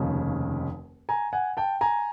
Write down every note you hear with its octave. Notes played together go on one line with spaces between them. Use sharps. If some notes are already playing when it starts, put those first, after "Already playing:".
Already playing: F1 D#2 C#3 F3
G#5 A#5
F#5 G#5
G5 A5
G#5 A#5